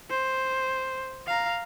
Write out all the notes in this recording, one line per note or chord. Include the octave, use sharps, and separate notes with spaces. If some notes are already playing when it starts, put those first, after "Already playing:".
C5
F5 A#5